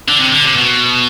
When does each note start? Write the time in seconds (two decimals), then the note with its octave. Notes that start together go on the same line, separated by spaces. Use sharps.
0.08 D3
0.19 C3
0.32 D3
0.44 C3
0.56 B2